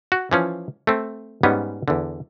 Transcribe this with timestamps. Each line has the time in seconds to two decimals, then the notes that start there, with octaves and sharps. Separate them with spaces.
0.12 F#4
0.31 E3 F3 C#4
0.87 A3 C4
1.43 G#2 G3 B3 C#4
1.88 E2 D3